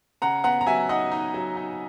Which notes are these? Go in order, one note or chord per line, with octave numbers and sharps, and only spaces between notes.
C#3 F#5 A#5
B3 F#5 A#5
A#5
F#3 E5 G#5
D#4 D#5 F#5
D#4
F#3
D#4